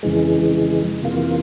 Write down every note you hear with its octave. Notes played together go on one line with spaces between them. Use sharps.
F2 C#3 E3 G#3
F2 C3 E3 A#3 F4